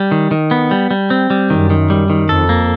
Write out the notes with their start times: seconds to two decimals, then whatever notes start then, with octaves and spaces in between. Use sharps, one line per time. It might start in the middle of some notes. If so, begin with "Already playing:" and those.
Already playing: G3
0.11 D#3
0.31 D#3
0.51 B3
0.71 G3
0.91 G3
1.10 C4
1.30 G3
1.50 F#2 D#3
1.70 D#3
1.90 G3
2.10 D#3
2.29 F2 A4
2.49 A#3